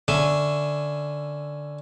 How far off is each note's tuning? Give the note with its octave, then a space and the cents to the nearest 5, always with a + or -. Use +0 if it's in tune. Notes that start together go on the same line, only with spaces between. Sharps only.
D3 +0 C#4 +0 E5 +0